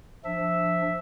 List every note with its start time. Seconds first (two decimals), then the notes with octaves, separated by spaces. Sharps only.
0.25 F3 D4 E5